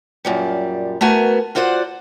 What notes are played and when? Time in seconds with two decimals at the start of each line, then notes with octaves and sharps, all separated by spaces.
0.25 F#2 A#2 G3
1.01 A3 B3 F#4 A#4 G#5
1.55 F4 F#4 C5 D5 E5 F#5